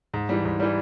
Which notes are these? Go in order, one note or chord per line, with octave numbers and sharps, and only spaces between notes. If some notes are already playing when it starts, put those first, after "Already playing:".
G#2
E3 G3
G#2
E3 G3